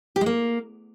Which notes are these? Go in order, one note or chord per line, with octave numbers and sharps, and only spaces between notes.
G4
G#3
A#3